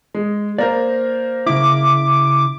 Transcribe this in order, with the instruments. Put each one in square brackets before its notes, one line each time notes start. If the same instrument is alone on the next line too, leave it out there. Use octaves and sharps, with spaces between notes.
[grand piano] G#3
[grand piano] A#3 A#4 [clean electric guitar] C5 D5
[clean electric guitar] C#3 E4 [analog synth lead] D6